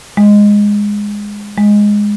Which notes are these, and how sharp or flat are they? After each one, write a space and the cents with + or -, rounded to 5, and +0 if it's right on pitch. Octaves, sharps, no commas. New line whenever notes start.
G#3 -10
G#3 -5